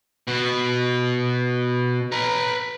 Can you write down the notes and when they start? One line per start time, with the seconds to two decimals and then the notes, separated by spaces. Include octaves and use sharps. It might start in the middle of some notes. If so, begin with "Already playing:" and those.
0.28 B2 F#4
2.12 B4 A#5